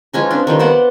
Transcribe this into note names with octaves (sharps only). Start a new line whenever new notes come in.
F3 G#3 C#4 D#4
C4 D4
D#3 F3 G3
B3 C5 D5 F#5